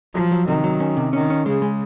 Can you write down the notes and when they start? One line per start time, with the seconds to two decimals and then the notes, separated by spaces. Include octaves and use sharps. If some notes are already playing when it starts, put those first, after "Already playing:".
0.14 F3 F#3
0.31 F#3
0.47 C3 D#3
0.64 F#3
0.80 C#4
0.97 C3
1.13 D#3 C#4
1.30 C#4
1.46 C#3 G#3
1.62 G#3